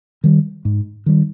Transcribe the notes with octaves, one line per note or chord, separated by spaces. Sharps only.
D#3 G3
G#2
D#3 G3